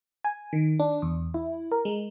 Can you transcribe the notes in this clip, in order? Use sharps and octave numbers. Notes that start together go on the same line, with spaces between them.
G#5
D#3
D4
E2
E4
A#4
G#3